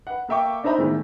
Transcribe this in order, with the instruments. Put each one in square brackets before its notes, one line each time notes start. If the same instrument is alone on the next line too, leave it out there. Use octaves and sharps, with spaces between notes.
[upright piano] B4 F#5
A#3 A4 E5 G5 C#6 D6
D4 D#4 C5 E5 A#5 B5
A2 D#3 E3 G#3 A3 B3